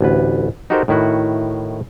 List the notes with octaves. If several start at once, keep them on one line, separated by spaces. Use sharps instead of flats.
A1 D2 B4
D#4 F#4 G4 A4 A#4 C5
A2 D#3 E4 F#4 F#5